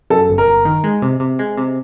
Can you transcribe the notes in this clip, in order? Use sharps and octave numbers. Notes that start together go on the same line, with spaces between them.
F#2 A4
G1
A#4
G1
D#3
G#3
C3
C3
G#3
C3